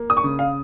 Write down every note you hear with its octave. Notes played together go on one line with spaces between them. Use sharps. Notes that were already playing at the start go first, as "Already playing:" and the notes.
Already playing: A#3
D#6
C#6
C#3
F5